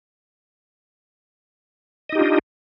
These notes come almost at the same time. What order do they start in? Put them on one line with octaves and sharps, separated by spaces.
D#5 D#4 G4 F4 D4